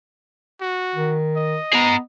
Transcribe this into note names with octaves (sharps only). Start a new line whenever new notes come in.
F#4
D#3
D#5
B3 G#4 A#5